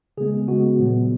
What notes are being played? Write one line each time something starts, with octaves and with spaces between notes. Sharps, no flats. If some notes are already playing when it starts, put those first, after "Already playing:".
C#3 G#3 B3 G#4
C#3 G#3 B3 F#4
A#2 F#3 B3